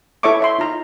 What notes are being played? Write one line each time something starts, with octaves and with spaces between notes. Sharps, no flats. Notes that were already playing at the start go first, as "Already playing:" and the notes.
E4 A4 C#5 E5 C#6 D6
C#5 E5 C6
D#4 F4 A#5